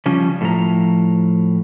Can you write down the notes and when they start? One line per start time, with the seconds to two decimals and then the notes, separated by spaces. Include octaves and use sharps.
0.06 C#3 F3 G3 C#4
0.41 A2 F3 A#5